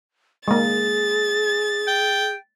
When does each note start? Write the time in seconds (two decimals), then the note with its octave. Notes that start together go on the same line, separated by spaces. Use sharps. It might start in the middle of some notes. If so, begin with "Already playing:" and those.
0.48 G#3 A#3 G#4 A6
1.87 G5